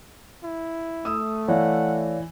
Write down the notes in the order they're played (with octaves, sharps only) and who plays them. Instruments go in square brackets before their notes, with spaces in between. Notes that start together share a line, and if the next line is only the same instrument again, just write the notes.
[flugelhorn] E4
[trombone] A3 [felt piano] D#6 E6
[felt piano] E3 [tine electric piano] C#5 D5 F5 [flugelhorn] F#5